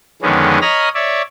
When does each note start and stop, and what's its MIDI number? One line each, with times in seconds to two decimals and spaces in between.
0.22 0.58 41
0.22 0.58 50
0.22 0.58 51
0.22 0.58 56
0.22 0.58 59
0.22 0.58 61
0.62 0.89 73
0.62 0.89 75
0.62 0.89 82
0.62 0.89 83
0.62 0.89 87
0.62 0.89 89
0.95 1.22 73
0.95 1.22 74
0.95 1.22 76